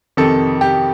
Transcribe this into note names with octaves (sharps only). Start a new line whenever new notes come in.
F2 C3 D#3 A4
G4